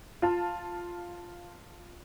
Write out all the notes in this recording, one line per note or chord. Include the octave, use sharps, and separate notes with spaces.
F4 A5